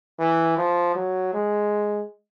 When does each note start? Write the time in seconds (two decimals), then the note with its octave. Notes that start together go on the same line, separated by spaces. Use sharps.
0.19 E3
0.58 F3
0.96 F#3
1.34 G#3